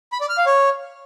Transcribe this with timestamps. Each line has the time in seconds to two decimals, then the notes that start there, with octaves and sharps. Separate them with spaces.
0.12 B5
0.21 D5
0.29 F6
0.38 F5
0.46 C#5